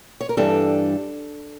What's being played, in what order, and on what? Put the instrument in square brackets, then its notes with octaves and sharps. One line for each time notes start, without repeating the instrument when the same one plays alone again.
[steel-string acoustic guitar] C#5
A#4
G2 E3 G3 D4 A4